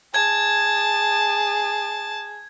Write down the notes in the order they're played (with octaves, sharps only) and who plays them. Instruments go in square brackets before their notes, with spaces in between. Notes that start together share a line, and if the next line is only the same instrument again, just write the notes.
[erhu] G#4 [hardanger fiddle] A5 [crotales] G#6